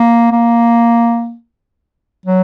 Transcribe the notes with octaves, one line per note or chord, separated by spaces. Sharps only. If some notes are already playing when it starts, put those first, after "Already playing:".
Already playing: A#3
A#3
F#3